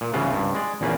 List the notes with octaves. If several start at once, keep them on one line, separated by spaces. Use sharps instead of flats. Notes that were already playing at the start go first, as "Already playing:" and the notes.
A#2
C2 G#2 C#3 E3 F4 F#5
C#2 G2 C4
G#3 D5
A#1 E2 A#3 C#4 B4 D5